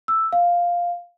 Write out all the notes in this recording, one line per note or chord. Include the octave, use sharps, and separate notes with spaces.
E6
F5